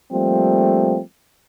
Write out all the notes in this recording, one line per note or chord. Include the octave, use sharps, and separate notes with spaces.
F3 G3 A3 A#3 C4